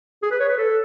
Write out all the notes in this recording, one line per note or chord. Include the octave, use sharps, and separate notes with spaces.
G#4
B4
C#5
B4
A4